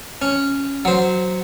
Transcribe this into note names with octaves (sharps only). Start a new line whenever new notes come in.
C#4
F#3 C5